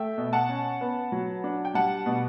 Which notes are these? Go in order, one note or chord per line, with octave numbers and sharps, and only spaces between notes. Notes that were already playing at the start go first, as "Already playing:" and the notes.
Already playing: A3 E5 G5
B2
F#5 A5
C#4
B3
F#3
D4
G5
G3 F#5 A5
B2